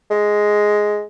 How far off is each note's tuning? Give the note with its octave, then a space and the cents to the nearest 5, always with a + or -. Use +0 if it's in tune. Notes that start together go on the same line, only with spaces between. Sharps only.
G#3 +5